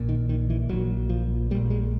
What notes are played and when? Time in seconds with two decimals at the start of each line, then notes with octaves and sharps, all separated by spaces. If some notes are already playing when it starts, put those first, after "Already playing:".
Already playing: A#1 A#2
0.09 D#3
0.29 D#3
0.50 E3
0.69 A#1 A#2 F#3
1.09 F3
1.50 A#2 G3
1.55 A#1
1.70 G#3